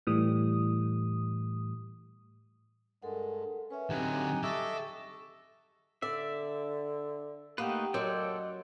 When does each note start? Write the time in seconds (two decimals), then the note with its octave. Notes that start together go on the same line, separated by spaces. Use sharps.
0.07 A2 E3 G3 D#6
3.02 G2 G#3 A4 A#4 F#5
3.70 C#4 B4 E5
3.90 D3 F#3 C4 D#4 G4 F#5 G#5
4.43 A4 D#5 E5 C#6 D6
6.02 D3 D5 E5
7.58 A3 A#3 D#4 G4 B4 F#5 G5
7.94 F#2 F#3 A4 D5 D#5 G5 C6